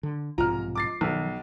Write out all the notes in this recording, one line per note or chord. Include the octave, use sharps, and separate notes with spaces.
D3
B1 G#2 C3 F3 A#5 F6
D6 A6 C7
B1 D#3